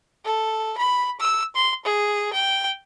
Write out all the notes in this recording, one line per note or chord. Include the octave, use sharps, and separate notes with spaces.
A4
B5
E6
C6
G#4
G5